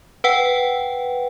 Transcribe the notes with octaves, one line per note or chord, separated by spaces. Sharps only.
B4 F#5 G5